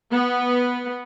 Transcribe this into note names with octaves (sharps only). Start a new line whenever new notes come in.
B3